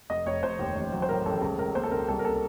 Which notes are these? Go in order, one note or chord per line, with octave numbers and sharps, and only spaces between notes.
F1 D#5
F1 C#5
F1 C5
D#2
A1
F#3
C5
A2 A#4
A1 A4
C#2 A4
C#2 A#4
A#3 C5
A4
C#2 A#4
C2 A4
A#4
A#3 A4